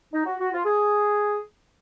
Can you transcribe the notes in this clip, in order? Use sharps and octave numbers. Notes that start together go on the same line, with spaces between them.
D#4
F#4
F#4
F4
G#4